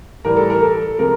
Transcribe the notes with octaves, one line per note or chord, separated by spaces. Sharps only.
A2 E3 G3 A#4
A4
A#4
A4
C3 F3 G#3 A#4